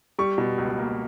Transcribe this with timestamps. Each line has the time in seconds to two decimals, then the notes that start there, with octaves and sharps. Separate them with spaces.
0.19 G3 C#6
0.38 B2
0.58 C#2
0.78 A#3